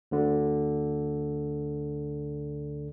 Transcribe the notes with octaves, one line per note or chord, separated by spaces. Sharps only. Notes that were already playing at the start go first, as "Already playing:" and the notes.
D2 D3